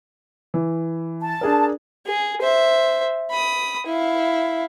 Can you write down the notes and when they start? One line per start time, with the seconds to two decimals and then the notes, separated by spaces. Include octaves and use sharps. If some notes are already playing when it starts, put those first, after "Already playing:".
0.54 E3
1.22 A5
1.41 D4 G#4 A#4
2.06 G#4
2.41 C5 E5
3.31 B5 D#6
3.86 E4 F5